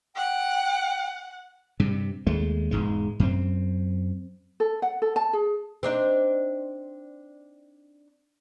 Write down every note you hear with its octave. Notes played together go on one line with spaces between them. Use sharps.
F#5 G5
G2 C3
D#2 G#3 A3
E1 G#2 G#3
F#2 C4
A4
F#5
A4
A5
G#4
C4 D4 D#4